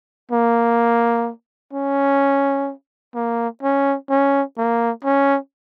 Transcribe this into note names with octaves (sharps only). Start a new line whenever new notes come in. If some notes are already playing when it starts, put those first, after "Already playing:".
A#3
C#4
A#3
C#4
C#4
A#3
C#4